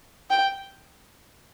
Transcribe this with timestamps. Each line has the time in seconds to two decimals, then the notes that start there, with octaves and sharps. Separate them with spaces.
0.30 G5